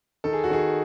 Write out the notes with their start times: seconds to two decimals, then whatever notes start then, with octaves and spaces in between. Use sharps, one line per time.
0.24 D#3 A4
0.33 G#4
0.44 F#4
0.50 D#3 G#4